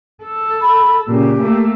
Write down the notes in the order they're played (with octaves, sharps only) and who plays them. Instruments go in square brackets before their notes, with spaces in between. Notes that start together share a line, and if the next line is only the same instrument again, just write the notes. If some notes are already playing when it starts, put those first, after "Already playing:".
[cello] A4
[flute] B5
[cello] A#2 C#3 [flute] G4
[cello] A3 A#3